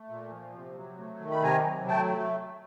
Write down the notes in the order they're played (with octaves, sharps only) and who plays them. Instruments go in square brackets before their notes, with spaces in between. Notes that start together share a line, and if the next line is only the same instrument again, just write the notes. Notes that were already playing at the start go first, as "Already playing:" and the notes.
Already playing: [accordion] A3
A#2
F3
C3
F#3
A3
D#3
B5
C3 G#5 A#5
F#3
A3 G5 A5